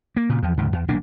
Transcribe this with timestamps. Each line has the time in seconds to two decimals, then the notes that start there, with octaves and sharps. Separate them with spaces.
0.17 A#3
0.29 A#2 C#3
0.43 E2 F3
0.57 D2 G#2 C#3
0.73 E2
0.88 D#1 B1 A#3 D4